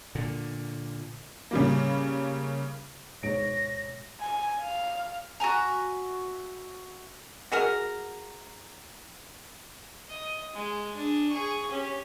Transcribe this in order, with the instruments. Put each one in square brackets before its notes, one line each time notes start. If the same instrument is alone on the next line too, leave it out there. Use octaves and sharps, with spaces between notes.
[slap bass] A#2 D3
[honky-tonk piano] C#3 G3 A#3
[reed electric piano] D2 G#2 B2 [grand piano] C#5 D7 [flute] A#6
[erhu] G#5
F5
[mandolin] F#4 E5 G#5 A#5
[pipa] F#4 G#4 A#4
[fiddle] D#5
G#3
D4 G#4
G#4 C#6
C#4 G4